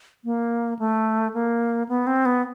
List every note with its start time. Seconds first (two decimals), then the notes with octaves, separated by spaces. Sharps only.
0.24 A#3
0.79 A3
1.34 A#3
1.89 B3
2.07 C4
2.25 B3